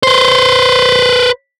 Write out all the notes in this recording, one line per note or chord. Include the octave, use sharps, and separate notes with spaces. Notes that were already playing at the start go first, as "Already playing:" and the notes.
B4 C5